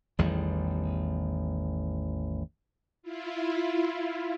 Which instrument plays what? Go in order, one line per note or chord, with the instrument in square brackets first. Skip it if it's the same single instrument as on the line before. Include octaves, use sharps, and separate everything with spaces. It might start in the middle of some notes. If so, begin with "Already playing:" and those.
[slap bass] A1 E2 D#3 G3
[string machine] E4 F4